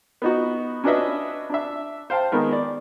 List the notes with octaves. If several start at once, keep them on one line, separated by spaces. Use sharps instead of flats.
B3 D#4 F#4
C#4 D4 F#4 B4 D#5 E5
D4 E5
C5 F5 G5 A5
D#3 G#3 B3 A#4
D5